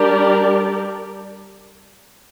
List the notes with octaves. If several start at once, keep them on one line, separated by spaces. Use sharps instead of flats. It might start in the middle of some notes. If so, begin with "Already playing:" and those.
Already playing: G3 D4 G4 A#4 D5